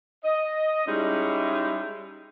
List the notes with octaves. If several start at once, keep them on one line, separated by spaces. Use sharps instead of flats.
D#5
G3 G#3 C#4 D#4 E4